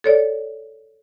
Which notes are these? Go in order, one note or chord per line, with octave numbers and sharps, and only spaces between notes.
A4 C#5 D5